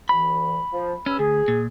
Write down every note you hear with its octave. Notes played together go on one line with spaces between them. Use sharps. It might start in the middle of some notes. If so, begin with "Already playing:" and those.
D2 E3 B5
F3
G2 C#4 B5 E6
D2 G#4
A#2